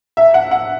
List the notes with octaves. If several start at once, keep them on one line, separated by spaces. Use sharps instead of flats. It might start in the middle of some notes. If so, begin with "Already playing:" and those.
E5
F#5
F#5